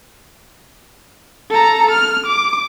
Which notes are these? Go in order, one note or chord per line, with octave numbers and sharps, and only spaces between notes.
A4 A#5
F6
D6